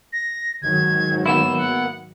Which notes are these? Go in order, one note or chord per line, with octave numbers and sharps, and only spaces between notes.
A#6
G#2 D#3 F#3 G#6
A#3 B3 E4 E7
F#5